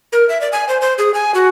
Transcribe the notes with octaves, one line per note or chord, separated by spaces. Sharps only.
A#4
E5
D5
G#5
C5
C5
G#4
G#5
F#4